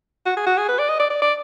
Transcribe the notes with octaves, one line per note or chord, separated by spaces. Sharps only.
F#4
G#4
F#4
G#4
B4
D5
D#5
D5
D5
D5